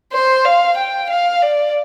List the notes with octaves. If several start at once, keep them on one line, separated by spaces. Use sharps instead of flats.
C5
F5
G5
F5
D5